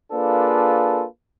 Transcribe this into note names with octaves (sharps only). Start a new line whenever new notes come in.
A#3 D4 F4 G#4 A4 B4